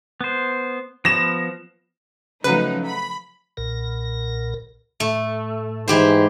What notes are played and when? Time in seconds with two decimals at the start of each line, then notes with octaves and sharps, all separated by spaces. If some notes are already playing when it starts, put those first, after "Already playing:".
0.21 B3 C5
1.05 F3 B3 A#6 E7
2.44 C#3 F3 F#3 A3 D#4 B4
2.86 B5
3.57 B1 A#2 A#4
5.00 A2 A3
5.88 G#2 E3 G4 C5